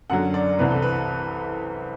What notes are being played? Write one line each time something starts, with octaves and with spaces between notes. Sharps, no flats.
F#2 D3 F#3 F#5
D5
C2 C3 E3 B4
A4
B4